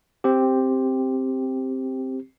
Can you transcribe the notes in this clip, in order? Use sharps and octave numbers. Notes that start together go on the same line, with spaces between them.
C4 G4